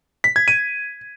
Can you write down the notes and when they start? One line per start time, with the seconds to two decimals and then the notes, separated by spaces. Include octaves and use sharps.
0.24 B6
0.36 G#6
0.48 D#7